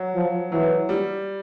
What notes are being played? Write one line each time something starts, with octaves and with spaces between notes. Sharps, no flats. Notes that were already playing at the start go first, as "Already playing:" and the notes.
Already playing: F#3
F3
E3 F#3
G3